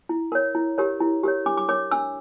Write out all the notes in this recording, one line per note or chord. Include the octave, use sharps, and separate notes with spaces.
E4
A#4 C#5
E4
G4 A#4 C#5
E4
G4 A#4 C#5
D4 D6
D6
A#4 C#5 D6
D4 E6